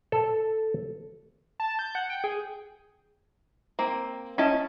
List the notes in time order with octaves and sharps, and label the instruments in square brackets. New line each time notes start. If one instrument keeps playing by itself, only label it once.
[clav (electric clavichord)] A4
[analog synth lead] A5
G6
F#5
G5
G#4
[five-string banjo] A#3 C4
[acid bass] C#4 [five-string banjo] E4 D#5 A5